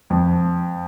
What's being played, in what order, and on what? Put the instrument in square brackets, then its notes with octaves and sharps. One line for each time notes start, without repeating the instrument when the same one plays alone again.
[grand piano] F2